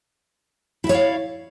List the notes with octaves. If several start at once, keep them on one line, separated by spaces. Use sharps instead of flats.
E4 C#5 D5 E5 F5